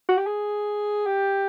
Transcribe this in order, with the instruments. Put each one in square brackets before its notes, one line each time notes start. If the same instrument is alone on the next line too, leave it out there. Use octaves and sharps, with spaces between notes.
[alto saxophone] F#4
G4
G#4
G4